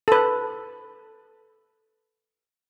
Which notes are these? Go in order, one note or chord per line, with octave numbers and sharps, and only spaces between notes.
A4 B4